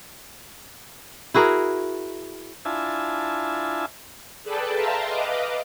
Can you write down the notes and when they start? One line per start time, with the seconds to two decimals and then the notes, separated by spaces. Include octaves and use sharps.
1.34 E4 F#4 G#4 A#4
2.65 D4 E4 F4 E5 G#5 A5
4.43 G#4 A4 B4 D5 G5 A5
4.74 E5 F5 G5 A5 A#5 C6
5.06 B4 D#5 F5 D6